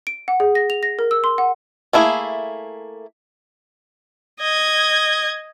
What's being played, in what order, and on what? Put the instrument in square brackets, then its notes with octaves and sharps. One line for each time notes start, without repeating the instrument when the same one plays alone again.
[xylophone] D7
F#5
G#4
A#6
F7
A#6
A#4
E6
C6
F#5
[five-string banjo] A3 A#3 E4 G#4
[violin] D#5 G#6